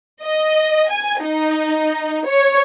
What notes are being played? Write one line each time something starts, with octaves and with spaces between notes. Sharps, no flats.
D#5
G#5
D#4
C#5